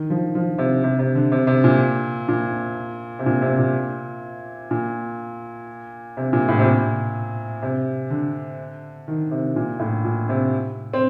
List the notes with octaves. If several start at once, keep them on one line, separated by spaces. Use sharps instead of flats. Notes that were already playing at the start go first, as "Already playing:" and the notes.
Already playing: D#3
F3
F3
C3
C3
C3
D3
C3
C3
A#2
A#2
C3
A#2
C3
A#2
A#2
C3
A#2
A2
C3
A#2
C3
D3
D#3
C3
A#2
A2
A#2
C3
C4